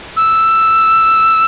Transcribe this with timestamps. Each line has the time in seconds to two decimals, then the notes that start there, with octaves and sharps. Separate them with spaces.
0.16 E6